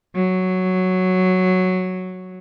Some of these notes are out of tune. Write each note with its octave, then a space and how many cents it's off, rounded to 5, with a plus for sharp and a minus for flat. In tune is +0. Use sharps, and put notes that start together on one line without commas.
F#3 +0